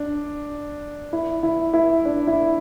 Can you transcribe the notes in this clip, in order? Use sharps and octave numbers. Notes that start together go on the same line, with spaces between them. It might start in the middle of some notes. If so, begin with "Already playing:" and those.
Already playing: D4
E4
E4
E4
D4
E4